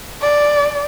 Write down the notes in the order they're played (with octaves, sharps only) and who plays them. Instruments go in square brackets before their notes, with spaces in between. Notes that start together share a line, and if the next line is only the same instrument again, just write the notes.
[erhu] D5